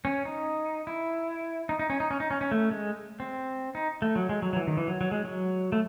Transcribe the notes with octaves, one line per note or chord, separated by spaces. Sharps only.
C#4
D#4
E4
D#4
D#4
C#4
D#4
C#4
D#4
C#4
C#4
A3
G#3
C4
D#4
A3
F#3
G#3
F#3
F#3
E3
D#3
E3
F#3
F#3
G#3
F#3
A3